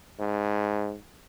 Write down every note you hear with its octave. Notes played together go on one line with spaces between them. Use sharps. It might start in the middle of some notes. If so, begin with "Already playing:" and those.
G#2